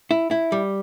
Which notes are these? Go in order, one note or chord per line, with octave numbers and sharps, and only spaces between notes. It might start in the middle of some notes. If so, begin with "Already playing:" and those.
E4
E4
G3